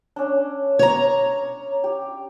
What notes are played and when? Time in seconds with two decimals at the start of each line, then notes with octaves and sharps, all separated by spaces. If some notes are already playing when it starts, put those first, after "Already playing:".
0.16 C#4 D4
0.79 C#5 A#5
1.84 G4